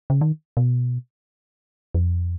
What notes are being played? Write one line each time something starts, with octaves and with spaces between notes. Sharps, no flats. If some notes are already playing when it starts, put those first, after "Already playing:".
C#3
D#3
B2
F2